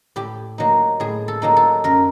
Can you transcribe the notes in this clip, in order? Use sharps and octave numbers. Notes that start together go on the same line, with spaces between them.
A2 G4
F#3 A#3 D#4
A2 G#4
A4
F#3 A#3 D#4
A4
F#2 A#4